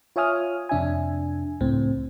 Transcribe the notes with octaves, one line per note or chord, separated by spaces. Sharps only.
F4 C#5 E5 G#5 D#6 F6
F2 C3 D4 E5 G#5
C#2 A2 C4